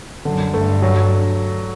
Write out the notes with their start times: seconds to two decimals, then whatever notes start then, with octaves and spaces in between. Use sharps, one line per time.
0.25 F#2 D3
0.53 G2 A3
0.82 F#3